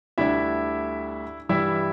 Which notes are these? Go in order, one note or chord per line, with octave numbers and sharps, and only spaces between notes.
D2 D3 G3 D4 E4 E5
G2 E3 G3 E4 E5